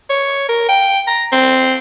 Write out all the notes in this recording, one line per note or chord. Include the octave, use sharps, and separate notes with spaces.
C#5
A#4
G5
A#5
C4